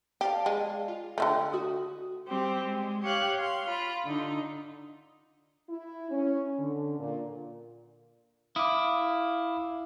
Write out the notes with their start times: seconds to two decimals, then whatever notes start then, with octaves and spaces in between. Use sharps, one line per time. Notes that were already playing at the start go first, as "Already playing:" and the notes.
0.21 G4 D5 F5 A5
0.46 G#3
0.88 F4
1.18 D3 D#3 A3 G5
1.53 F#4 D#6
2.27 G3 C4 G4
2.64 G#3
3.02 G4 C#5 F5 F#6
3.36 F5 C6
3.67 F4 B5
4.04 D3 D#4
5.69 E4
6.11 C#4
6.59 D3
7.00 A#2
8.56 E4 F5 D6 D#6